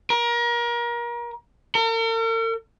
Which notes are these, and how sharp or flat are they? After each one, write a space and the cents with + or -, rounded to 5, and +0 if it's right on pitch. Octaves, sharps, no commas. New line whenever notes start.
A#4 +30
A#4 -45